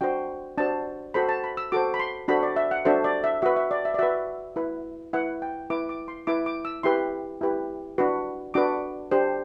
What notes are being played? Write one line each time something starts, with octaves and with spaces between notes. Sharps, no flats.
D4 F#4 C5 G5
D4 F#4 C5 A5
F#4 A4 C5 B5
A5
B5
E6
F#4 A4 C5 D6
B5
C6
D4 F#4 A4 C5 B5
D5
E5
F#5
D4 F#4 A4 C5 E5
D5
E5
F#4 B4 E5
E5
D5
E5
D5
F#4 B4 E5
E4 B4
E4 B4 F#5
G5
E4 B4 D6
D6
C6
E4 B4 D6
D6
E6
E4 G4 B4 C6
E4 G4 B4
D4 F#4 B4
D4 F#4 B4 D6
D4 G4 C5